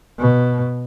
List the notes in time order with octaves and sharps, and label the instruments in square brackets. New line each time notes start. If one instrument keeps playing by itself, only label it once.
[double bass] B2